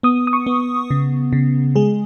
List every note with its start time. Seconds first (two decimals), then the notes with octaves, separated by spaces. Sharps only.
0.03 B3 D#6
0.27 D#6
0.33 C#6
0.47 B3
0.90 C#3
1.33 C#3
1.76 G#3 G#4